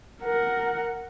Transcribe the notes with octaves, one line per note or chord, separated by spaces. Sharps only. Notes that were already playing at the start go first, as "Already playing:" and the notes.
A#4 F#5